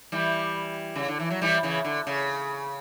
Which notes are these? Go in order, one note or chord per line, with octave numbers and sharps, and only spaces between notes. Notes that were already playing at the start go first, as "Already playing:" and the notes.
E3 G3
C#3
D3
E3
F#3
E3 G3
C#3 E3
D3
C#3